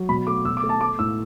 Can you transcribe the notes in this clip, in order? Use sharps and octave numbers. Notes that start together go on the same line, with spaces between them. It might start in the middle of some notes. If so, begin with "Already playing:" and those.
Already playing: F#3
B2 B5
A3 D6
B2 E6
D6
A3
A5
A3 D6
A2 E6